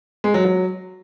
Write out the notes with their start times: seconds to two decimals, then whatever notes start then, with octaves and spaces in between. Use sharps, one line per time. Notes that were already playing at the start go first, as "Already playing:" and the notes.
0.24 G#3
0.34 F#3
0.44 F#3